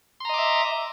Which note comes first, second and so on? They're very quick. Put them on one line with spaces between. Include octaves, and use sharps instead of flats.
C6 A#5 D#5 D6 E5